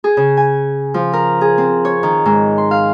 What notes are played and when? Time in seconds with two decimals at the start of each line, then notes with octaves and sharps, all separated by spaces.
0.04 G#4
0.17 C#3
0.37 G#5
0.94 F3
1.13 A#4
1.41 G#4
1.58 C4
1.85 C#5
2.03 D#3
2.26 G#2
2.58 C6
2.71 F5